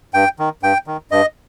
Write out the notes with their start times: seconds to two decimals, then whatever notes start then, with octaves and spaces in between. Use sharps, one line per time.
0.14 G2 G5
0.39 D#3
0.63 G2 G5
0.87 D#3
1.11 G2 D#5